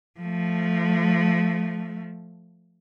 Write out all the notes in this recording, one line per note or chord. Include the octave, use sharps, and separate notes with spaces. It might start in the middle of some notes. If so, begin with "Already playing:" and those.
F3 A3